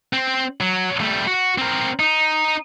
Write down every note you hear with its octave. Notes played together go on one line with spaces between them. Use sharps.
C4
F#3
G3 A3
F#4
C4 A#4
D#4